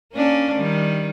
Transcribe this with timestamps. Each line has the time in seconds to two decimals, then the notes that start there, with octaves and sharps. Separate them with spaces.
0.13 A#3 C#4 D4
0.57 D#3 G3